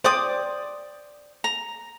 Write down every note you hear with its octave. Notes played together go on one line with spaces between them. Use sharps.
C5 D5 G5 D6 D#6
A#5